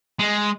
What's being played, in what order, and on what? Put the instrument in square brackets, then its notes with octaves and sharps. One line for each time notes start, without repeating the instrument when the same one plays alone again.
[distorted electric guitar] G#3